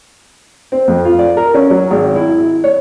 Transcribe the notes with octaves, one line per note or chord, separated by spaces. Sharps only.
C4
F2
F4
D5
A#4
C#4
F#3
G#1
E4
C#5